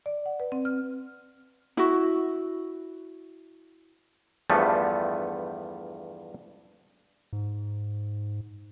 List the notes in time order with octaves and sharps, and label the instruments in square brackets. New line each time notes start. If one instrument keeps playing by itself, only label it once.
[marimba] D5
F#5
B4
C4
F6
[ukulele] E4 F#4
[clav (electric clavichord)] E2 G2 F3 G3 A3 B3
[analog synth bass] G#2